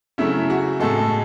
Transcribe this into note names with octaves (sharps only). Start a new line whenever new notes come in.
C#3 F#3 A3 E4
F#4
A2 G#3 A4